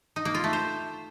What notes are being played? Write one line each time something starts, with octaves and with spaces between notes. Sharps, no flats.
D#4
A#3
F4
A3
C5